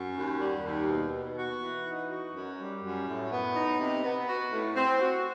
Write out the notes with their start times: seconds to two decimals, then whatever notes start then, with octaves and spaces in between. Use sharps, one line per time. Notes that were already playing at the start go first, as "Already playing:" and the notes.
Already playing: F#2
0.17 D#2
0.40 G3
0.64 D#2
0.89 B2
1.13 B3
1.37 F#4
1.61 E3
1.86 D#4
2.10 F#4
2.35 F#2
2.58 G3
2.83 F#2
3.06 A2
3.31 B3
3.54 D#4
3.79 C3
4.03 B3
4.27 F#4
4.51 A2
4.75 C4
5.00 F#4